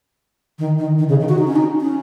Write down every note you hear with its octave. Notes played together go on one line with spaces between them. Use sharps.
D#3
D#3
D#3
C#3
D#3
F#4
D#4
C#4
D#4
C#4